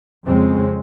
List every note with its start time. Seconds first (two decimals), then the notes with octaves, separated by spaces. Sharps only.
0.25 F2 C#3 G#3 C4 C#4